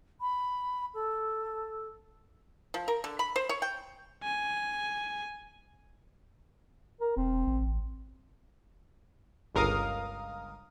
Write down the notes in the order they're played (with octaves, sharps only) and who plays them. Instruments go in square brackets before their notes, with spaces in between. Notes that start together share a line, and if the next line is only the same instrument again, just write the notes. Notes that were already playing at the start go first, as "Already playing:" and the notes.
[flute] B5
A4
[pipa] F3
A#4
D3
B5
C5
C#5
G5
[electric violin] G#5
[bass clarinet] A#4
[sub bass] E1 [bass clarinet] C4
[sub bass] A1
[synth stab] G1 C#2 A#4 F5 D#6